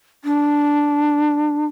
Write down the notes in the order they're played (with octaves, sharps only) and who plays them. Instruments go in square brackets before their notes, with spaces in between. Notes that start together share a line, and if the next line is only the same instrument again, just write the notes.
[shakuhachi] D4